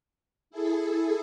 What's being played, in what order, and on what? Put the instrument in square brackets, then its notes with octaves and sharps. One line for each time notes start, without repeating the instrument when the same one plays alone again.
[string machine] E4 G#4 A4